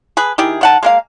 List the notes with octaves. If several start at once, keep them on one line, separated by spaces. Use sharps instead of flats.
G#4 B4
D#3 E4 G4 G#4
D#3 F#5 A5
G#3 A#3 F5